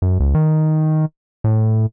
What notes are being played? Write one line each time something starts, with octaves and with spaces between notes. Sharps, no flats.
F#2
C#2
D#3
A2